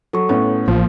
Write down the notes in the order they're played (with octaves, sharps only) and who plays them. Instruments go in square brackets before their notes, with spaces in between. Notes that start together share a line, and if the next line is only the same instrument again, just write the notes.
[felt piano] F#3 [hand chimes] A4 C#6
[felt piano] A2 B3 C#4
[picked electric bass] A1 [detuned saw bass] F3 [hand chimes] A#3